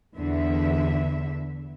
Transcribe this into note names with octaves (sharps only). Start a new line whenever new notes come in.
E2 D3 E5